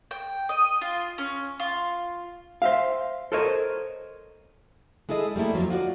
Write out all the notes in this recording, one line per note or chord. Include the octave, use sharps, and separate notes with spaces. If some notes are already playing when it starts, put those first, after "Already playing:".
G5
D#5
F4
C#4
F4
C5 E5 F5
A4 A#4 C5 C#5 D#5
G#3 E4 G#4 A4 D#5
G3 A3 A#3 E4 A4
F2 F3 F#3
F4 F#4 A#4 D5